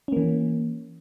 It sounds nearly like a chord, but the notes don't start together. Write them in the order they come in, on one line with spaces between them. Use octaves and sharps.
C#4 A#3 E3